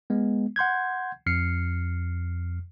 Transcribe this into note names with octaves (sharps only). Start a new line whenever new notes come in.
G#3 B3
F#5 C6 G6 G#6
F2 F6 C7 C#7